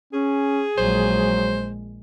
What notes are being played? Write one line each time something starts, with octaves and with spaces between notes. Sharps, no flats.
C#4 G#4
A#1 F#3 G#3 C5